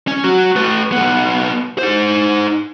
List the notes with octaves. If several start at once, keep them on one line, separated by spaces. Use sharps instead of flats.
C#4
F#3 F#4
A3 B4
B1 B3
D#4 C5